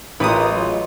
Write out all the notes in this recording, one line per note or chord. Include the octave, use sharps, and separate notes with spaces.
A1 G#3 F4 A#4 B4 D#6
F#3 G#3 F4